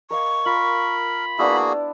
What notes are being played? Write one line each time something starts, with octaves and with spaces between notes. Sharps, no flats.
A#4 D#5 F5 C#6
F4 A#4 B5
A#3 B3 D4 E4 F#4 G#4 D5